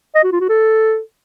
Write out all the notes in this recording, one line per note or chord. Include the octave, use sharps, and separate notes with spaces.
D#5
F#4
F4
F#4
A4